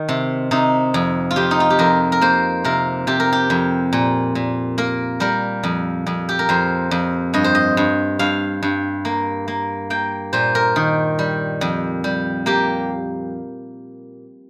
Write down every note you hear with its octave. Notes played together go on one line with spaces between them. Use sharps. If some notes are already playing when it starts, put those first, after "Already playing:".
Already playing: D#3
C3
C3 D#4
F2
F4
F2 G4
D#4
F4
G4
F2 A#4
A#4
A#3 C5
C3 A#4
C3 G4
A#4
G4
F2
A#2
A#2
A#3 A#4
G3 A#4
F2
F2
G4
A#4
F2 C5
F2
G2 D#5
C5
D#5
G2
G2 F5
G2
A#3
A#3
A#3 G5
A#2 C5
A#4
D#3
G3
F2
G3
A#3 G4